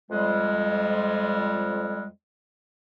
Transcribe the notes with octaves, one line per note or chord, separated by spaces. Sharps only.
F2 G3 G#3